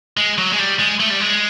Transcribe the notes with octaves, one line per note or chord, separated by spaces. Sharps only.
G#3
F#3
G#3
G3
G#3
A3
G3
G#3